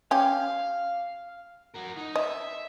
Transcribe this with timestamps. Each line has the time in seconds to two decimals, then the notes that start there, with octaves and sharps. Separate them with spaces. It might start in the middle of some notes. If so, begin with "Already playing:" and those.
0.11 C#4 G4 F5
1.74 F#4 A#4
1.97 D#4
2.16 D#5 E5